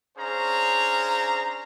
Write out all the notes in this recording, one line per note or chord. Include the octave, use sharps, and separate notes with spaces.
C#4 D4 G#4 C5 F5 A#5